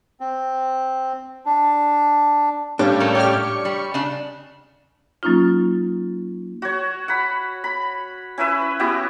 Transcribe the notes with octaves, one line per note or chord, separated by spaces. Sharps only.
C4
D4
A2 G3 C#4 D4 G4 F5
A3 A4 A#4
G4 C#5 D5 F6
C#6
G3
C#3 D4
F#3 A#3 C#4 D#4 F4
F#4 C#5
F#5 B5
B5
C#4 E4 B4 E5
B3 E4 F#4 G4